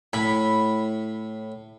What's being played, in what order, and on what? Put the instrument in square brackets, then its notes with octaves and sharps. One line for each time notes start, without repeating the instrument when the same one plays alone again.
[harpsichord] A2 [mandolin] B5